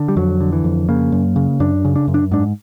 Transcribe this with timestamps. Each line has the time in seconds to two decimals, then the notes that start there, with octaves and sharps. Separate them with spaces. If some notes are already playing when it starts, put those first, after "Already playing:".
Already playing: D3
0.08 G3
0.16 F2 F#3
0.40 D3
0.52 E3
0.64 F2
0.89 C#3 A#3
1.12 F#2
1.36 C#3
1.60 F#2 D4
1.85 C#3
1.96 D4
2.08 F#2
2.14 D4
2.32 G#2 D4